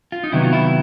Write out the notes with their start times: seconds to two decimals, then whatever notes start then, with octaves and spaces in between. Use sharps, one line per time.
0.12 F4
0.24 D#4
0.32 C3 D#3 F#3 B3 E4
0.45 F4
0.53 E4